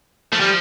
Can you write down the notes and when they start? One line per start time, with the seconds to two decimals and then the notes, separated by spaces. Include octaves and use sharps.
0.33 F3 A3
0.40 G3